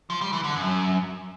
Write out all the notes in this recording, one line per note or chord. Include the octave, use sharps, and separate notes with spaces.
F3
G3
E3
D3
F#2